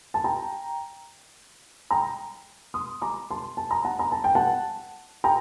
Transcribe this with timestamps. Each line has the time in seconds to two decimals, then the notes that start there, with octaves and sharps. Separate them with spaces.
0.14 A5
0.24 G5 A#5
1.91 G5 A#5
2.74 C6 D#6
3.02 A#5 D6
3.31 A5 C6
3.57 A5
3.71 A#5
3.85 F#5 A5
3.99 A#5
4.12 A5
4.24 G5
4.35 F#5 A5
5.24 G5 A#5